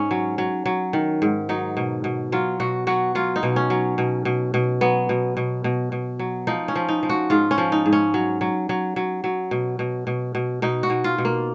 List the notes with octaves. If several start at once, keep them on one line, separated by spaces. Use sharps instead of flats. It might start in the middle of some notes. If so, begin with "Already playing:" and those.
Already playing: G#2 C#4
F#3
F#3
F#3
D#3
G#2
F#3 D#4
B2
B2
F#3 F4
B2 F#4
F#3 F#4
F#3 F4
D#4
B2
C#4
F#3
B2
B2
B2
F#3 B3
B2
B2
B2
B2
F#3
F3 D#4
C#4
F3
D#4
F3
F#4
G#2 F4
C#4
F3
D#4
G#2
C#4
F#3
F#3
F#3
F#3
F#3
B2
B2
B2
B2
B2 D#4
F#4
B2
F4
B2
A#3